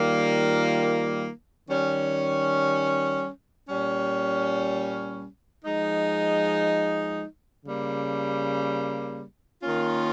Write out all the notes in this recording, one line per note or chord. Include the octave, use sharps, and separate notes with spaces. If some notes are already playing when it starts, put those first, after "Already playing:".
Already playing: D#3 G3 A#3 F4
D#3 G3 C#4
A#2 G3 C#4
F3 G#3 D#4
C#3 G3 A#3
D#3 A#3 C#4 F4